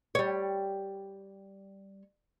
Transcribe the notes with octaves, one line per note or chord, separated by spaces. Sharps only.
G3 C#5